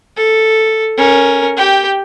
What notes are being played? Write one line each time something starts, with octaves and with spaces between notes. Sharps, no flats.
A4
C#4 A#4
G4 G5